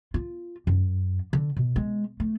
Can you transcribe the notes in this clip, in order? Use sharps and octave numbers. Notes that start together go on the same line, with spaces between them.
F4
F#2
D3
B2
G#3
A3